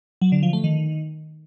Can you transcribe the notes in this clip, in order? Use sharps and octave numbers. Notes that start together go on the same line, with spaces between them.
F#3
D3
F3
A3
D#3